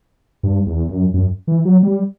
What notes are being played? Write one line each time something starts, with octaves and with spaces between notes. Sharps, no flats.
G2
E2
F#2
F#2
E3
F#3
G3